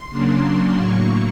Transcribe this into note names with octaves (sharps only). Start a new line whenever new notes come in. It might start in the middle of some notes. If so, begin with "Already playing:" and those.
Already playing: C6
C#3 F#3 A#3 D4
A2 F#3 A#3 C#6